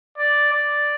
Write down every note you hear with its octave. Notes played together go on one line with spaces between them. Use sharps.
D5
D5